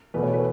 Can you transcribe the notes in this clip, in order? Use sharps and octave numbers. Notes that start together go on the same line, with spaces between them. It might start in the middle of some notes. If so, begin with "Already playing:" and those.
E2 B2 A3 B4
C#5
B4